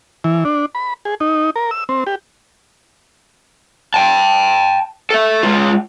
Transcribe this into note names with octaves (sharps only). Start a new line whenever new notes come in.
E3
D4
B5
G#4
D#4
A#4
E6
C4
G4
G5 A5
A4 E5
G#3 F4